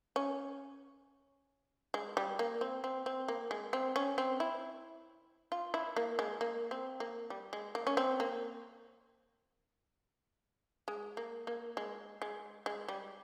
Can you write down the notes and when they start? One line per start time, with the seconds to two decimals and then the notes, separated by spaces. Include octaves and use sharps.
0.16 C#4
1.94 G#3
2.17 G3
2.39 A#3
2.61 C4
2.84 C4
3.06 C4
3.28 A#3
3.51 G#3
3.73 C4
3.96 C#4
4.18 C4
4.40 E4
5.52 F4
5.74 E4
5.96 A#3
6.19 G#3
6.41 A#3
6.71 C4
7.00 A#3
7.30 G3
7.53 G#3
7.75 A#3
7.87 C#4
7.97 C4
8.20 A#3
10.88 G#3
11.17 A#3
11.47 A#3
11.77 G#3
12.22 G#3
12.66 G#3
12.88 G3